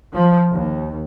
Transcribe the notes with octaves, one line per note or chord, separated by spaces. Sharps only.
F3
D#2